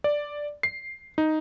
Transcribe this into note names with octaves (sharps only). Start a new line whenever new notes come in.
D5
C7
D#4